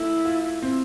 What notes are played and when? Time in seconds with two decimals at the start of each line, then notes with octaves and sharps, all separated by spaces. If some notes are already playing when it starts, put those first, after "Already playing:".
Already playing: A3 E4
0.25 F4
0.62 C4